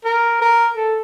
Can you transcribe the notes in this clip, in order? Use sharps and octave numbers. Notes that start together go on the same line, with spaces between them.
A#4
A#4
A4